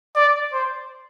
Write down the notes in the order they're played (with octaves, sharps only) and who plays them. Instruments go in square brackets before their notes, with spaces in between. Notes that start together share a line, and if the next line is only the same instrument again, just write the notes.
[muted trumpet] D5
C5